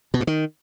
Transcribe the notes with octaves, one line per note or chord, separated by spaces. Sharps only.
B2
G2
D#3